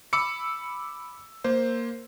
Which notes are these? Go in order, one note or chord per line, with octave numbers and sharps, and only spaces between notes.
B5 D6 E6 C#7
A#3 C5